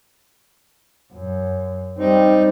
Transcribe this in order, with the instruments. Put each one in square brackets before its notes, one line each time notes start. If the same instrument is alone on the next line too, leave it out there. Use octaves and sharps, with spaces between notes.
[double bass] F#2
[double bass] G3 C4 [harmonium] D#4